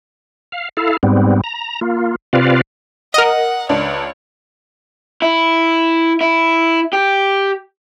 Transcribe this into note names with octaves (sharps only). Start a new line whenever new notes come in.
F5
E4 A4 F5
G#2 G3 B3 C4
A#5
A#3 F4
C3 C4 F4 B4 D5 F5
A#4 D#5 F#5
C#2 D4 C#5
E4
E4
G4